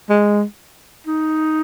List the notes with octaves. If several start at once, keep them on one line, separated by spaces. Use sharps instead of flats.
G#3
D#4